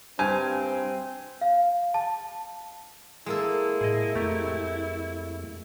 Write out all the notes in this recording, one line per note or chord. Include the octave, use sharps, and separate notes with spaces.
G2 C4 C5 G#5
F5
A5
G#3 A#3 E4 A4
A2 G#4 D#5
F2 A3 G4 A#5